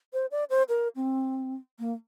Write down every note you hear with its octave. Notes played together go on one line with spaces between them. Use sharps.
C5
D5
C5
A#4
C4
A#3